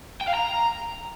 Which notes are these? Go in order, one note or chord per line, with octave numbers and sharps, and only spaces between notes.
G5
F5
A#5